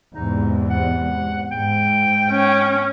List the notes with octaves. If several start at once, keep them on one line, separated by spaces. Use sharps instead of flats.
E2 G#2 C3 D#4
F#5
G#2 G5
C#4